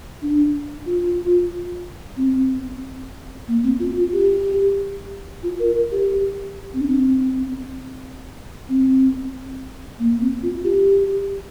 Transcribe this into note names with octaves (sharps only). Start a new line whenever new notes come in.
D4
F4
C4
A#3
C4
F4
F4
G4
F4
A#4
A#4
G4
C4
D4
C4
C4
A#3
C4
F4
G4